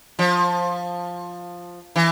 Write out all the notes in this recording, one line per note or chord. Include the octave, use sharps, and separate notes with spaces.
F3
E3